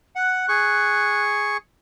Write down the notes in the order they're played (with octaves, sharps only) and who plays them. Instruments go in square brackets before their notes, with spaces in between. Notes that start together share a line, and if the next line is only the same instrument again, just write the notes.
[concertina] F#5 [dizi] F#6
[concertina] G#4 C#6